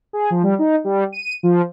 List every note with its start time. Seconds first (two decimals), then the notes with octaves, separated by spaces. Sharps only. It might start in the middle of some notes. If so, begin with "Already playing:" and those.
0.13 G#4
0.30 F3
0.43 G3
0.59 D#4
0.84 G3
1.13 D#7
1.43 F3